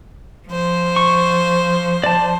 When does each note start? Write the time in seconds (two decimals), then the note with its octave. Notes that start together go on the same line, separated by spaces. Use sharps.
0.47 F3 C5
0.96 C#6
2.04 D5 A5